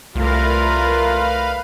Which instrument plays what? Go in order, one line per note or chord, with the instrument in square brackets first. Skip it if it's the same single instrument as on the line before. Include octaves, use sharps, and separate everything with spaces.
[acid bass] C2 [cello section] A3 A#4 [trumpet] F4 [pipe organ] B4 F5